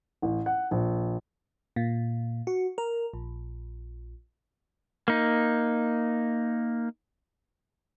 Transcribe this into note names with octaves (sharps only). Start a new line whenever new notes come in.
A1
F#5
A#1
A#2
F#4
A#4
A#1
A#3 D#4